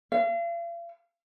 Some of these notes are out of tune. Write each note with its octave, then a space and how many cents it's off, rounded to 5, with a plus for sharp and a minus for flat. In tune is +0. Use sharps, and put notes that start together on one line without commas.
F5 -40